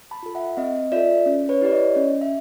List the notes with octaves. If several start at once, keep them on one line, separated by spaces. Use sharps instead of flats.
A5 B5
F4 A4
E5 F#5
C4 D#5 F5
F4 A4 D5 E5
C#4
B4 C#5
E4 G4 D5
C#5 D#5
C#4
E5